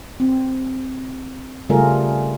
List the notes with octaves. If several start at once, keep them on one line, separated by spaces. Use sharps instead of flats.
C4
C#3 G3 A3 F4 G#4 A#4